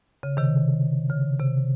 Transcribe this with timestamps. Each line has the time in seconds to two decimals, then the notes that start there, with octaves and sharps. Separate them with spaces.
0.23 C#3
0.37 C3 D#3
1.10 C#3
1.39 C3